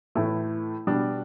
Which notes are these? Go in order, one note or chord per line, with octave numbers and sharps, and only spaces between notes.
A2 E3 A3 E4
B2 G3 D4